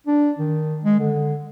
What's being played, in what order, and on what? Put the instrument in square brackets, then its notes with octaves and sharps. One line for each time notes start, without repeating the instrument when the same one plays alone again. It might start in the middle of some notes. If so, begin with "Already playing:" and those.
[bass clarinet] D4
D#3
G#3
D3